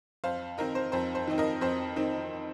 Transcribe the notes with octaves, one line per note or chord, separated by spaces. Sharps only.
F2 C5 F5
D#3 C4 D#4 A#4
C5
F2 C5
C5
D#3 C4 D#4
A#4 D#5
F2 C5
D#3 C4 D#4